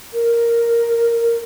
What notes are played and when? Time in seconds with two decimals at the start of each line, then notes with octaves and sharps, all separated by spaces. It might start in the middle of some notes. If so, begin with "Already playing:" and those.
0.13 A#4